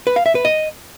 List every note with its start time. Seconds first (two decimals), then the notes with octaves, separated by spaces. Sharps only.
0.07 B4
0.16 F5
0.26 E5
0.35 B4
0.45 D#5